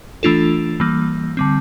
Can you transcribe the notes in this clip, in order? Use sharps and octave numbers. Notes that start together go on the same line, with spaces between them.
E3 A3 D4 F4 A4
E3 G3 A#3
D3 G3 C4